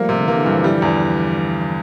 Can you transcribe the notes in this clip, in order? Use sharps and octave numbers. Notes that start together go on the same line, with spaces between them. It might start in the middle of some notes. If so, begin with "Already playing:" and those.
Already playing: F3 G3 A3 A#3
C3
D3
E3 A#3
D3
G2 E3
F3
G3 E4
E2